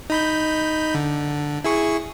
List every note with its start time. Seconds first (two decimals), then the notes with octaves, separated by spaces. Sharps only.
0.10 D#4 B5 G6
0.95 D3
1.65 E4 G#4 C#6